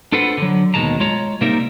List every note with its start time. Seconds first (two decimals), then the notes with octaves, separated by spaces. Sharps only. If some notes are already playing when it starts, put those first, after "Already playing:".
0.12 D4 F4 A4 B4 C5 F#5
0.38 D3 F#3
0.74 D#2 B2 D#3 G#3 A5 A#5
1.00 G#3 F4 C#5 A#5
1.41 C3 G3 A#3 D#4 A#4 E5